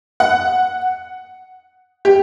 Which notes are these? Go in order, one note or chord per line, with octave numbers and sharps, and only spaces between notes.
F#5
G4